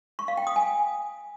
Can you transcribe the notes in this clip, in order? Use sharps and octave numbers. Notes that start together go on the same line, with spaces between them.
C#6
F5
G5
D#6
G#5